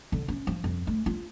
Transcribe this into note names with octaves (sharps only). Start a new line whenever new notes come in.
D3
C#4
F3
F2
A3
F4